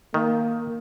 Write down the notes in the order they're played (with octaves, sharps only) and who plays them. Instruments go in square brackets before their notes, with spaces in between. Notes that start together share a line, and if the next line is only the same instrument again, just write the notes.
[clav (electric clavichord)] D#3 [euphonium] A#3